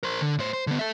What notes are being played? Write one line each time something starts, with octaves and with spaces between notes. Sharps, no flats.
A#4 C5
D3
A2 C5
C5
D3 B3
A4 E5